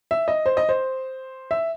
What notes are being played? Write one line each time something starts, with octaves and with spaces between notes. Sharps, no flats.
E5
D#5
C5
D#5
C5
E5